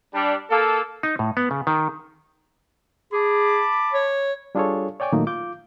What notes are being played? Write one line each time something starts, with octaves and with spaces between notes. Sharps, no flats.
G3 D4
A#3 A4
D#4
A2
B3
C#3
D#3
G#4 A5 B5 D6
C#5
G3 D4 F4 G#4 A4 C#5
C#5 D5 G5 G#5 D6
A#2 D#3 F#3 A3 A#3 D#4
F4 D6 G6